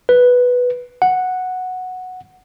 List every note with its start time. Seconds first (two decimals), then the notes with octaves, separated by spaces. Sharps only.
0.09 B4
1.02 F#5